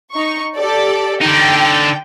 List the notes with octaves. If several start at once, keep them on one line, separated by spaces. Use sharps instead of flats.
D#4 C#6
G4 A4 D5
D3 D#4 G5